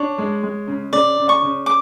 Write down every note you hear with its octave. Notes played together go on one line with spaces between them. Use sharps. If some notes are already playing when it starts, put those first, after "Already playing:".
Already playing: D4 C#5
G#3
G#3
C#3
C#3 D5
C#3
C#6
C#3
D6